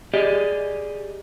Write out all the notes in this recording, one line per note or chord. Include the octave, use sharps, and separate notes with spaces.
G4 G#4 D5 D#5